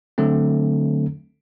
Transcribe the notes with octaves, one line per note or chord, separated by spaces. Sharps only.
D3 F#3 A3 C4